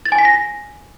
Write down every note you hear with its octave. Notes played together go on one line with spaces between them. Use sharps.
A6
G#5
B6
A#6